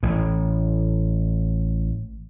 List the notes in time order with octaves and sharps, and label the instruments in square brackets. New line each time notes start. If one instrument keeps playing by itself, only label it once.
[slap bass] A1 A2